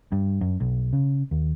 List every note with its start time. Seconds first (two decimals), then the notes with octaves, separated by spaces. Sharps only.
0.12 G2
0.41 F#2
0.60 B1
0.93 C#3
1.31 D#2